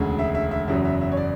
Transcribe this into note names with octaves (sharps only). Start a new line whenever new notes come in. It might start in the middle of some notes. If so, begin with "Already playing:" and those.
Already playing: E1 D2 C#3 G#3
E5
E5
E5
F#1 E2 C#3 F#3 E5
E5
E5
C#5
D5